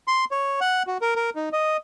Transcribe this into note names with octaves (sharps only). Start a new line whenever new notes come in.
C6
C#5
F#5
F#4
A#4
A#4
D#4
D#5